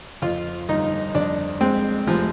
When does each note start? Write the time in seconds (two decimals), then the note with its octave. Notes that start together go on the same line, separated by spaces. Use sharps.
0.22 F2 F4
0.69 G1 D#4
1.15 F2 D4
1.61 G#3 C4
2.07 F1 F3